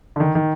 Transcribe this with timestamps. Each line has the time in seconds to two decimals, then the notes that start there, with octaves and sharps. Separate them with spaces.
0.16 D3
0.20 D#3
0.35 D#3